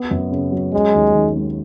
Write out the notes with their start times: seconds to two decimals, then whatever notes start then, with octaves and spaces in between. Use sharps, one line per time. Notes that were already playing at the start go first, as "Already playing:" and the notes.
Already playing: B3
0.11 F#2
0.31 C#3
0.52 F#3
0.73 G#3 C#4
0.94 D#2
1.14 D#3
1.35 G#3